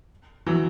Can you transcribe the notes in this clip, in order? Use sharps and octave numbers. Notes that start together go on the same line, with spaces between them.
E3 F#3